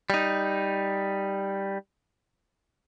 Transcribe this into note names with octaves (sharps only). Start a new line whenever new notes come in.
G3 D#4